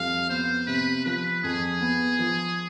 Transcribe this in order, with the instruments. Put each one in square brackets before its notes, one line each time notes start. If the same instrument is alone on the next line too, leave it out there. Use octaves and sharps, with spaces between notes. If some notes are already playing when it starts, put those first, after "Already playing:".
Already playing: [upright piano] F2 G3 [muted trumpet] F5
[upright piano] B3 [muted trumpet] C5
[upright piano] C3 [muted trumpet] B4
[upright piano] F3 [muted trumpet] B4
[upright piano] F2 [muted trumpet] G#4
[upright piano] B3
F3